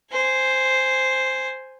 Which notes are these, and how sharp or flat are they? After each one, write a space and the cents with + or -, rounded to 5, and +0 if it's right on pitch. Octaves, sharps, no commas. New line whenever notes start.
C5 +0 G#5 +0